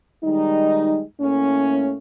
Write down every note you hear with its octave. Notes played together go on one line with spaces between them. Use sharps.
D#3 G3 G#3 D#4
A2 A3 A#3 C#4